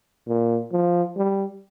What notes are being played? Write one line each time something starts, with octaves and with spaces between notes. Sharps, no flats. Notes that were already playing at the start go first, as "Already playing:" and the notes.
A#2
F3
G3